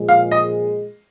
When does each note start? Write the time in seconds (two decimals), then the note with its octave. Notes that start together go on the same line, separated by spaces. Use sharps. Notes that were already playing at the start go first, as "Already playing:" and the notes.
Already playing: A#2 F3 G#3
0.09 F5
0.31 D#5